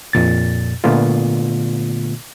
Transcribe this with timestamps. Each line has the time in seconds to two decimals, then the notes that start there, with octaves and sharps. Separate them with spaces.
0.13 F2 A#2 A6
0.84 A#2 D3 A3 B3 F4